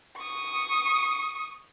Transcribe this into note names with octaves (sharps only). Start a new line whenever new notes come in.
C#6 D#6